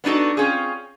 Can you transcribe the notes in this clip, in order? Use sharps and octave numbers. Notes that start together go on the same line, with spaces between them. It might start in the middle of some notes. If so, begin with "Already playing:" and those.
B3 D4 D#4 F#4 A4
C4 C#4 F4 G#4